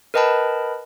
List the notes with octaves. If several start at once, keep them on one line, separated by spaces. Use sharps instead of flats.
A#4 B4 D#5 G5 A5 B5